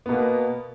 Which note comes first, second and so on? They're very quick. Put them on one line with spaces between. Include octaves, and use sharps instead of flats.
B3 B2 A#3